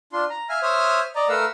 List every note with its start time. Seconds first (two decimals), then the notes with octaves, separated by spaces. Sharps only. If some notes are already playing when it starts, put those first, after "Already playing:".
0.13 D4 F4 C6
0.30 A#5
0.49 E5 F5 G#5 F6
0.62 C5 C#5 E5 D#6 F6
1.15 D5 D#5 A#5
1.29 A3 A#4 B4 F5 F#5 E6